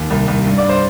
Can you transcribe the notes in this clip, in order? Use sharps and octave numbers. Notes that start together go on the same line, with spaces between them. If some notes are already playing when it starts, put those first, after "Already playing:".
Already playing: D#2
C2
C2
G2
D5
G2
C5